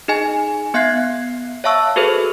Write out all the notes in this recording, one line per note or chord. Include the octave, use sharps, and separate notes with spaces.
D#4 G#4 D#5 G#5
B3 E5 F5 F#6 G#6 C7
C#5 E5 F5 A5 C#6 E6
F#4 G#4 A4 B4 C5